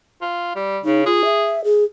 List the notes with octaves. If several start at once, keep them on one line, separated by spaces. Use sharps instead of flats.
F4
G3
C#3 D#4
F4 G#4
E5
G#4